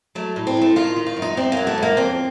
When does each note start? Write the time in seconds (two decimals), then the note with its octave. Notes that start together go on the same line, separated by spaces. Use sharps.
0.15 F#3 A3
0.36 A2
0.47 C4
0.57 A2 A3
0.76 D#3 F4
0.96 D#3
1.07 F4
1.17 F#2
1.22 D#4
1.37 F#2 C4
1.52 F#3 A#3
1.67 A3
1.78 F#2 A#3
1.97 F2 C4